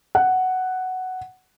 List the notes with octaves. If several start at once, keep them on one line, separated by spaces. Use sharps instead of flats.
F#5